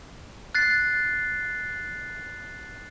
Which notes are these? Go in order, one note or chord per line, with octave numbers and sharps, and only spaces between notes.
F#6 A6 C7